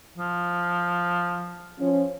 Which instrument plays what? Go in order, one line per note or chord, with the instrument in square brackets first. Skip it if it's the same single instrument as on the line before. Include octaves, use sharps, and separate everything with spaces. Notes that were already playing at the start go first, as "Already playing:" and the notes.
[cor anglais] F3
[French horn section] F3 C#4